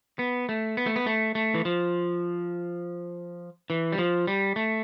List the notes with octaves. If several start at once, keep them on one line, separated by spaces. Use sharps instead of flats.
B3
A3
B3
A3
B3
A3
A3
E3
F3
E3
G3
F3
G3
A3